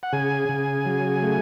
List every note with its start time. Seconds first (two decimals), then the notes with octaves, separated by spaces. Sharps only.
0.03 F#5
0.12 C#3 G#4 G#5
0.49 C#3
0.86 F#3
1.22 A3